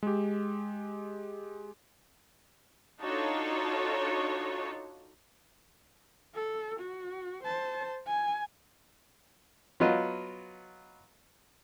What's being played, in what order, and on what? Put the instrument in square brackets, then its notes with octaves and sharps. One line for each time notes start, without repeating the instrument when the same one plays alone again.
[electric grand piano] G#3 G4
[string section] D4 D#4 F4 F#4 A4 C#5
[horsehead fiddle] A4
F#4
C5 A5
G#5
[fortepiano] F#3 B3 F4 D#5